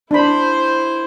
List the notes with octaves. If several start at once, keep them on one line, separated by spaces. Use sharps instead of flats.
D4 E4 C5 B5